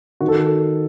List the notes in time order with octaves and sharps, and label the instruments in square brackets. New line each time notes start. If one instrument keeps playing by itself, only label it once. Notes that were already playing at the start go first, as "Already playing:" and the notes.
[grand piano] D#3 F#4
A4